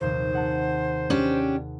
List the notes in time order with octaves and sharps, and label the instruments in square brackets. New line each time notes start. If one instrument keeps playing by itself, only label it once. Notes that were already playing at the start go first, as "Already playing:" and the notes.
[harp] A#1 D#2 C3 [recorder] C5
[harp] G#4 F#5 A5
[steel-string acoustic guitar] C#4 D4 G4